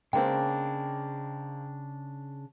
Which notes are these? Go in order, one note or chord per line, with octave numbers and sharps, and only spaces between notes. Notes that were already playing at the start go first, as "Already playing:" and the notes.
C#3 G#3 A#3 C4 D4 G5